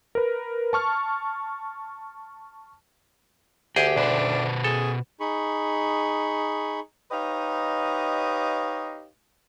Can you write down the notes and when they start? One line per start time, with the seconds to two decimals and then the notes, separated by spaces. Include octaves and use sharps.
0.15 A#4 B4
0.73 A5 C#6 F6
3.76 D2 G4 G#4 G5
3.96 B2 D4 B4 C5
4.64 G#4 A4
5.20 D#4 G#4 B5 C#6
7.12 D#4 G4 B4 C#5 D#5 F5